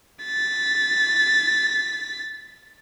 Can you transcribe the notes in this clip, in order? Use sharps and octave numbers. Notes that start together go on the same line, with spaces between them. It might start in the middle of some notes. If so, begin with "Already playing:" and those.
A6 B6